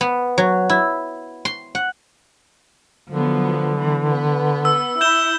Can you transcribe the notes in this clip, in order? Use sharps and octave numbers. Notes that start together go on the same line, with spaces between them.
B3
F#3
E4
C6
F#5
D3 F3 F#3 B3
E3
B3
E6
E4 G6 E7 G7